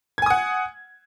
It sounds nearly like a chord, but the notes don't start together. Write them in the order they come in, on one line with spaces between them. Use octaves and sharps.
G#6 G#5 D#6 F#5